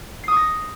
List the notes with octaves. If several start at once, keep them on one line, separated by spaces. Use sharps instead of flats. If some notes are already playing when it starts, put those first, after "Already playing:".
C#6 D#6 A#6 C7